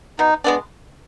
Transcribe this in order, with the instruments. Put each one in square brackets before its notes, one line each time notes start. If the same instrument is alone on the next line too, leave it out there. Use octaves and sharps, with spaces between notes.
[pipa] B2 [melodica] D#4
[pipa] G#3 B3 D4